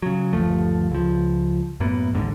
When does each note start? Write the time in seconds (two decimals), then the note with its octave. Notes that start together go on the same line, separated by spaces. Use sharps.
0.02 C#3 F#3
0.33 G1 D#2 F3 A3
0.91 C#2 F3
1.80 F#2 A2 A#3 B3
2.13 A1 D#2 G#2 D3